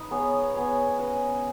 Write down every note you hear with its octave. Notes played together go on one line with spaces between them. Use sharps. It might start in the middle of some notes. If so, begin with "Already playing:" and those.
Already playing: D#4 B4
B3 G#4 C#5
B3 G#4 C#5
C#4 B4 D#5